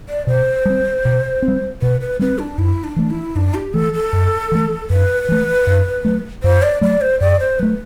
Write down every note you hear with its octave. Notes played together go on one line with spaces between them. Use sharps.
D5
B2 C5
G3 C4
B2
C4
G3
B2 B4
B4
G3 C4 B4
D4
F#2 E4
D4
E3 A3
E4
F#2 D4
G4
E3 A3 A4
A4
F#2
E3 A3
F#2 B4
E3 A3
F#2
F#3 A3
F#2 C5
D5
F#3 A3 D5
C5
F#2 D5
C5
F#3 A3 B4